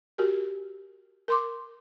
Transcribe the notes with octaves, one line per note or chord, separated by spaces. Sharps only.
F#4 G4 A#4
A#4 C6 D6